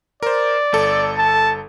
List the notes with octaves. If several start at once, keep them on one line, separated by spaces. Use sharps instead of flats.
A#4 C5 D5
G1 A4
A5